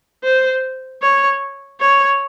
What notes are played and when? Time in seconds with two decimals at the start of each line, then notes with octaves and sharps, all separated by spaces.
0.24 C5
1.03 C#5
1.81 C#5